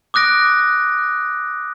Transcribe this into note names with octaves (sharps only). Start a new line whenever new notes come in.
D6 D#6 F#6 A#6 D7